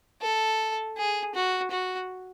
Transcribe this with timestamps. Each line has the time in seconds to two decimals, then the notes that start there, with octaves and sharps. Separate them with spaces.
0.21 A4
0.97 G#4
1.35 F#4
1.71 F#4